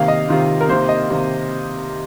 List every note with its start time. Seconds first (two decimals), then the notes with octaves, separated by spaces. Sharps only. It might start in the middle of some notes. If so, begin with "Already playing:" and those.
Already playing: C3 D#3 A#3 F5
0.08 D#5
0.28 C3 D#3 A#3 F4
0.61 A#4
0.69 C3 D#3 A#3 C5
0.89 D#5
1.10 C3 D#3 A#3